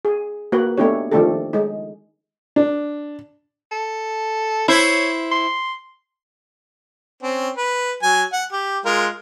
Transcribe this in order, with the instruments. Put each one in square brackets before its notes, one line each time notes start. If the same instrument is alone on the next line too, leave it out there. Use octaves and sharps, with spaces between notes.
[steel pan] G#4
A#3 F#4 B4
A3 B3 D4 D#4 G4 C#5
D#3 F3 A3 D4 G4 A4
G#3 D#4
[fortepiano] D4
[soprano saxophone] A4
[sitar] E4 C5 [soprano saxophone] C#5
[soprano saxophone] C6
[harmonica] C4 C#4
B4
F#3 G#5
F#5
G4
G#3 F4 A#4